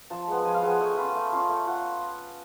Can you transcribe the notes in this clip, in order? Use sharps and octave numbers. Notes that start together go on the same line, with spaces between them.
F3 A5
G#3 B3
F3 G#5
F5
G#3 B3 F#5
A3 G#5
C#4 F4 B5
A3 A5
C#4 F4
A3
F4 F#5